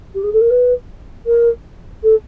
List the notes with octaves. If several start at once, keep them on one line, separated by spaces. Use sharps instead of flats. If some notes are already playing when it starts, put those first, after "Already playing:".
G4
G#4
A4
A#4
B4
A#4
A4